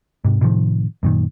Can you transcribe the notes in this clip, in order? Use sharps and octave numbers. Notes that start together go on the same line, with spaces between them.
G#2 C3
A2 C3 D#3 F3
F#2 A#2 D#3